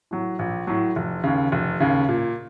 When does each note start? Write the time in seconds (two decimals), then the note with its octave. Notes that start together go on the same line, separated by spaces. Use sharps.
0.11 A2 F#3
0.39 A#1
0.67 A2 F#3
0.96 F1
1.24 D#2 C#3
1.52 F1
1.80 D#2 C#3
2.09 A#2